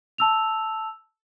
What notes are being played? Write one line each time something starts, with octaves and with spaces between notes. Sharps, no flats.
A5 E6 F7